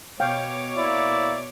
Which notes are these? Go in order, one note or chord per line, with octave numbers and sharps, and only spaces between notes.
B2 C#5 F5 G5 D6
A#3 E4 D5